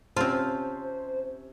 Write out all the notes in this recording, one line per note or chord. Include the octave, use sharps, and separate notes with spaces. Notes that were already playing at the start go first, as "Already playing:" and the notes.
C3 C4 C#4 F4 C5 A5